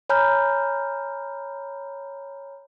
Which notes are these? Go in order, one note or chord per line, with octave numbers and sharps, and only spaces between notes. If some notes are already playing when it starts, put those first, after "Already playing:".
C#5 G#5 A#5 B5 F6 G6